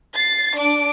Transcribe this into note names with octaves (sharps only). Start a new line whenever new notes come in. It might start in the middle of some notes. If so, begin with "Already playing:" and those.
A6 C7
D4 D6